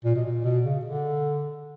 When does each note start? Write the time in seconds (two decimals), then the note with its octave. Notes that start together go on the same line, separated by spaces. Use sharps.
0.05 A#2
0.15 B2
0.25 A#2
0.44 B2
0.64 C#3
0.85 D3